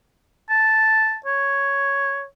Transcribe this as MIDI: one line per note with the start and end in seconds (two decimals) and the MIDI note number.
0.50 1.17 81
1.26 2.25 73